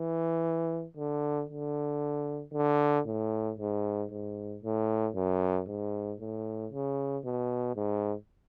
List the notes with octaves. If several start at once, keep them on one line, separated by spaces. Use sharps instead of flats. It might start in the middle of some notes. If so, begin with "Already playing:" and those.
Already playing: E3
D3
D3
D3
A2
G#2
G#2
A2
F#2
G#2
A2
C#3
B2
G#2